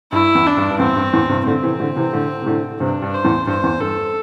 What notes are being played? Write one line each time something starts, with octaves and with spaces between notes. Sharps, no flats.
G2 E4
E2
D4
G2
G2
E2 A2 C4
G2
E2 A2
G2 C3
A2 D3 C4
C3 E3
A2 D3
C3 E3
A2 D3
C3
A2 D3
G2 C3 D4
G2
C5
E2 A2
G2 C5
E2
G2 A4